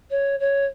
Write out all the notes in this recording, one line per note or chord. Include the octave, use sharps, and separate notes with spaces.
C#5
C#5